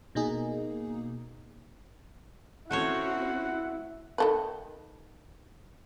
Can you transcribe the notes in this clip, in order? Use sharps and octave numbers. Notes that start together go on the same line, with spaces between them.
B2 A#3 D#4 G#4
A3 C4 C#4 E4 F#4 C5 C#5 F#5
D#3 A4 B4